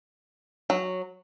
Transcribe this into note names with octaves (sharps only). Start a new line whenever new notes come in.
F#3